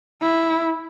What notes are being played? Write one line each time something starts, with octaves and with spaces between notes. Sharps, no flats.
E4